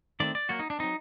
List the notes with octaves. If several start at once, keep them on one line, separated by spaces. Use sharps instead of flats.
D#3 A3 C4 D5
D5
F#3 A#3 F#4
D#4
D4
F#3 C4 D#4